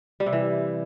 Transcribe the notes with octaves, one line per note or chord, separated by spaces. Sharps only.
G3
C3
E3